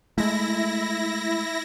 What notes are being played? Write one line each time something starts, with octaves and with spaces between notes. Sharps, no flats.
G#3 A3 E4 A#6